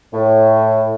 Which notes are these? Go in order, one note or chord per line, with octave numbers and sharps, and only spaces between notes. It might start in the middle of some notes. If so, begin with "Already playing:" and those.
A2